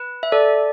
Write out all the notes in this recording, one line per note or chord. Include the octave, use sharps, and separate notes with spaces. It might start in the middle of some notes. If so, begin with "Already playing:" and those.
Already playing: B4
E5
A4 D5